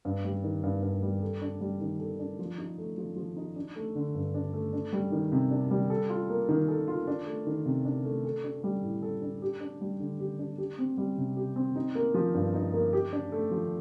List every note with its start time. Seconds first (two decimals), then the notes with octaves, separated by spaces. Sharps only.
0.05 G2
0.24 G3
0.44 D#3
0.63 G2
0.83 G2
1.02 G3
1.22 A4
1.42 D4
1.61 G3
1.81 D#3
2.00 A4
2.19 D4
2.39 F3
2.58 D#4
2.78 A3
2.98 F3
3.16 F3
3.37 D#4
3.56 D4
3.76 A3
3.95 D3
4.15 G2
4.34 D4
4.54 A3
4.73 D4
4.93 G3
5.12 D#3
5.32 C3
5.51 D4
5.71 G3
5.90 A4
6.09 F4
6.30 A#3
6.49 D#3
6.68 A4
6.88 F4
7.07 D4
7.26 A3
7.47 D#3
7.66 C3
7.85 D4
8.05 A3
8.25 A4
8.44 D4
8.64 G3
8.83 A2
9.03 A4
9.22 D4
9.42 G4
9.61 D4
9.81 G3
10.00 D3
10.20 G4
10.39 D4
10.58 G4
10.79 C4
10.98 G3
11.18 C3
11.37 G4
11.56 C4
11.76 D#4
11.95 A#3
12.14 F3
12.34 G2
12.54 D#4
12.73 A#3
12.93 G4
13.13 D4
13.32 A3
13.51 F3